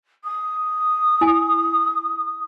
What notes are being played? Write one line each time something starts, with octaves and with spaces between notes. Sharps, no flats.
D#6
E4 G#5